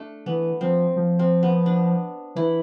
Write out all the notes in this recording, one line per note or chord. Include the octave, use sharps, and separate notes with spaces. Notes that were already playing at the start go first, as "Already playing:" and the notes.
Already playing: A3 D4
E3 B3
F3 C4
F3
C4
B3
D4
E3 E4